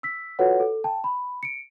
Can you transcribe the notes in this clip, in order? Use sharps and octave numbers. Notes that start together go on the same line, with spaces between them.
E6 B6
F4 F#4 A4 B4 C#5 F#5
A4
G5 A5
B5
C#7 D7